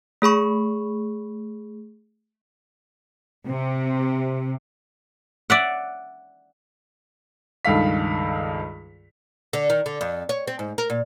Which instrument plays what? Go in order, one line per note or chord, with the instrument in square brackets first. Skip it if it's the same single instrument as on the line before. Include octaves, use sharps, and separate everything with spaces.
[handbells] A3 G#4 B5 C#6
[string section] C3
[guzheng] D5 E5 F#5
[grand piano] C#2 G2 D#3 A4 F5 B6
[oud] D3
D#3
D3
F2
C#5
C4
G#2
A#4
A#2